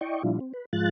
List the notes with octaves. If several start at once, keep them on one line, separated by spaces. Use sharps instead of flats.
E4 D5 D#5 G5 C#6
A#2 F3 G3 D4 E4 F4
C4
B4
G#2 F3 G#3 F4 F#6 A6